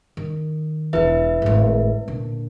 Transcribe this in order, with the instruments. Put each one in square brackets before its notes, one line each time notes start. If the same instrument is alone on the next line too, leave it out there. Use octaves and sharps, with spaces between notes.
[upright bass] D#3
[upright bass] E1 E2 [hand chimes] E4 B4 E5
[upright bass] G#1 A2
A#2 D3